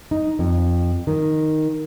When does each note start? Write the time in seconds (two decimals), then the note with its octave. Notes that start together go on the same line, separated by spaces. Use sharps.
0.11 D#4
0.39 F2
1.07 D#3